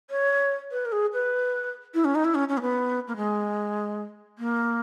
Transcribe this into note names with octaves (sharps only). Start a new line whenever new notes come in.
C#5
B4
A#4
G#4
B4
E4
C#4
D#4
E4
C#4
C#4
A#3
B3
A#3
G#3
A#3